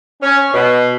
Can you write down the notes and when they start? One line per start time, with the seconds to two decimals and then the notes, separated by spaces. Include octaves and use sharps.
0.22 C#4
0.54 B2